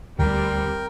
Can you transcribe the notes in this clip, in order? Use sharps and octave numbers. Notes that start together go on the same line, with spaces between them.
D2 G3 C4 A#4 G5